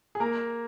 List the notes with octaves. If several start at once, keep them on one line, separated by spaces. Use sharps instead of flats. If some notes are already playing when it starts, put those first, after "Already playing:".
G#4
A#3 A#4